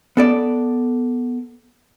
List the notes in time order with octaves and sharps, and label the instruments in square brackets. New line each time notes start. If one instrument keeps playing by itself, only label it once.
[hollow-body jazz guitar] B3 A4 D5